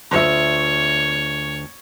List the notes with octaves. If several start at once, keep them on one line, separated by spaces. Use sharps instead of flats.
D2 F4 C#5 E5